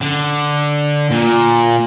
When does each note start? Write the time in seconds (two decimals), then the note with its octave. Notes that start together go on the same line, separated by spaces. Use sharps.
0.01 D3
1.11 A#2